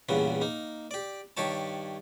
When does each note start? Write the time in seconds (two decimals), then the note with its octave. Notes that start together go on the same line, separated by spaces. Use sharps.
0.09 E2 G2 A#2 C#3 B3
0.41 A#3 D#4
0.91 G4 D5
1.37 G2 D#3 G4 C#5 A5